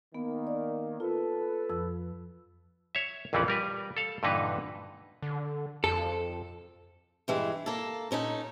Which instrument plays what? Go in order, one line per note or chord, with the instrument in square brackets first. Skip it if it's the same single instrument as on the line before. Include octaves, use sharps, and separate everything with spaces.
[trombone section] D#3 A#3 [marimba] B3
[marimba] D5
[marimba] F4 [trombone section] A4 B4
[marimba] F2 F3 E6
[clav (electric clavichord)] C#5 E5
A#1 F2 E3 C4 C#4 D5
G3 A#4 B4
A4 F5
G2 A#2 D3 E3 D#4 B4
[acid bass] D3
[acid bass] F2 [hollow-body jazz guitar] A4
[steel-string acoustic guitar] G2 E3 G#3
A#3 A4
A#2 C#4 D#4 A4